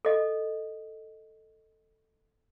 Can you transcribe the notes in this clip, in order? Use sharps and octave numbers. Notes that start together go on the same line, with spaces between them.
A4 D#5